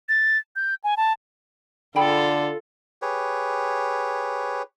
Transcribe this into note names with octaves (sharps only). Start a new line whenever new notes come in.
A6
G6
G#5
A5
D3 F4 G#4 A4 G5 B5
G4 G#4 B4 C#5